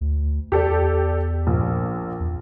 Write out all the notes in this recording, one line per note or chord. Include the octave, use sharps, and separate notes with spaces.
D2
E2 G4 A4 D5
A#1 A#2
E2